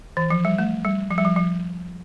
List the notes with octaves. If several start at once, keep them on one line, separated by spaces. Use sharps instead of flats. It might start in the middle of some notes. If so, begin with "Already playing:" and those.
E3
F3
G3
A3
G3
F3
G3
F3
F3